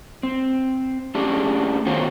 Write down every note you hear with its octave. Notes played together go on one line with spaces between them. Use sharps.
C4
A3 C#4 D4 G4 G#4
D#3 B3 C#4 F4 F#4 C5